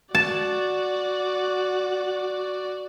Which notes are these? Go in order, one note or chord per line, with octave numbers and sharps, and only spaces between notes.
F#4 D5 A5